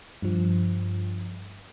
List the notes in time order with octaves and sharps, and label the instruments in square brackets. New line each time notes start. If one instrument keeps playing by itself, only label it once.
[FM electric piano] G2 F3